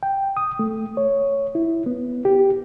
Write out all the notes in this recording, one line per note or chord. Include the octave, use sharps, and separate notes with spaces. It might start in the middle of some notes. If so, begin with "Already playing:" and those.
G5
D#6
A3
C#5
E4
B3
G4